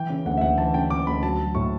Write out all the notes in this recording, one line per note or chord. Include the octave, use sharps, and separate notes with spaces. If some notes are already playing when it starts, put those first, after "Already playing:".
Already playing: E3 G5
C#3
D2 F#5
E5
D2 F#5
E3 A5
C#3 G5
C#3 D6
D2 B5
F#3 A5
F#3
A2 C#6